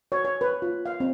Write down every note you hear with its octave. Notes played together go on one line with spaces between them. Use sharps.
C#5
C#5
B4
F4
F5
C4